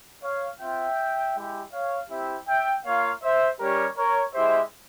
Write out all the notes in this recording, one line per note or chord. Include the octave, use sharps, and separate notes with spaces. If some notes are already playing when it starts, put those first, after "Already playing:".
C#5 F5
C4 F4 E5 G5
G#3 E4 G4
C#5 F5
C4 E4 G4 E5 G5
E5 G5
A#3 F4 C#5 F5
C5 E5
G3 C#4 G4 A#4 C#5
A#4 C#5
G#3 E4 G4 C5 E5